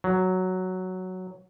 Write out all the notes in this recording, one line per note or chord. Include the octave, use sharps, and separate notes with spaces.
F#3